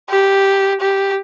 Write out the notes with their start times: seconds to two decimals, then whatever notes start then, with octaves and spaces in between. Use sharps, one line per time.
0.10 G4
0.80 G4